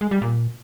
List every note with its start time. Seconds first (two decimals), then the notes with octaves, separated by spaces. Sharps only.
0.01 G#3
0.11 G3
0.22 A#2